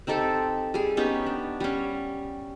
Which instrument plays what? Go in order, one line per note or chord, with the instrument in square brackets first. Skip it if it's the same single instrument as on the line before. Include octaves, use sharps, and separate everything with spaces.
[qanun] C4 D#4 G4 A4
G3 G#4
B3 C#4 D#4 G4
D4
G3 C#4